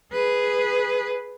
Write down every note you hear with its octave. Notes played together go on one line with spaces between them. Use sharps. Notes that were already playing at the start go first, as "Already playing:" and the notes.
G#4 B4